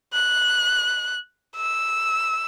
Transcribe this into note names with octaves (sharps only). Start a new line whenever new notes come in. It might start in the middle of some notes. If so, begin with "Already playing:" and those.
F#6
E6